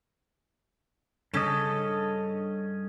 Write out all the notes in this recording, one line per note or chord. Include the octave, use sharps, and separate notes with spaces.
G2 C#3 C#4 A4 D#5